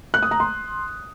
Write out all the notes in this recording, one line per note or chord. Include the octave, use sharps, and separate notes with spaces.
F#6
D#6
A#5
C6